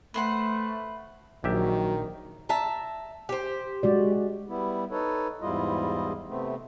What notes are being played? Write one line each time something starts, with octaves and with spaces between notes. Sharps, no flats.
A3 B4 C5 F#5
A#1 D#3 F#3 G4 E5
E5 A5 A#5
G4 C5
G#3 F#4 D5
G3 B3 E4
D#4 A4 B4 C#5
E2 G#2 G3 E4 F4 D#5
C3 A3 B3 C4